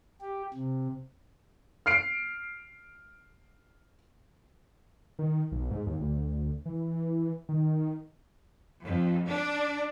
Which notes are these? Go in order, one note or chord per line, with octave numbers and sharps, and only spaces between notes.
G4
C3
F6 C7 D7
D#3
B1
G#2
D#2
D2
E3
D#3
F2
D4